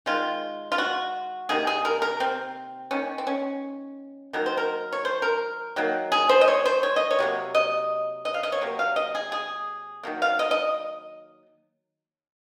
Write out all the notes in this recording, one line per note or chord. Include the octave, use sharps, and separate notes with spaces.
D#3 G#3 F4
F4
F#4
C3 D#3 A#3 G#4
G#4
A#4
A#4
C4
D#3 A#3 C#4
C4
C#4
D#3 F#3 A#3 A#4
C5
A#4
C#5
C5
A#4
D#3 F#3 A#3
G#4
C5
D#5
C#5
C5
C#5
D#5
C#5
C3 F#3 A#3
D#5
D#5
F5
D#5
C#5
C3 F#3 A#3
F5
D#5
G#4
G#4
D#3 F#3 A#3
F5
D#5
D#5